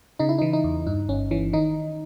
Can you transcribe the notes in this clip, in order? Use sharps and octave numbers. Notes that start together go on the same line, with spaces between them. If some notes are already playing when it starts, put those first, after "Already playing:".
C#3 D#4
E4
E3 D#4
D#4
E2
G2 D#4
G1 C#4
E3 C#4
D#3 D#4